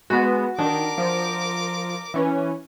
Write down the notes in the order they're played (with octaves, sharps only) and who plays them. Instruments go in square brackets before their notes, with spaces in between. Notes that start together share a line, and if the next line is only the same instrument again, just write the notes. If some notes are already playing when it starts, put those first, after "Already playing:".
[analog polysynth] G#3 B3 [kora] F#4
[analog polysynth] D#3 [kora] D4 [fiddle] A#4 D6
[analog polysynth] F3
E3 C#4